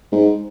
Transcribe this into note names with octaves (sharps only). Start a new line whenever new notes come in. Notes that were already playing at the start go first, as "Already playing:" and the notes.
G#2